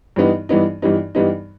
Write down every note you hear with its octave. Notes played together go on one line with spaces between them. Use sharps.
G2 E3 G3 B3 D#4
G2 E3 G3 B3 D#4
G2 E3 G3 B3 D#4
G2 E3 G3 B3 D#4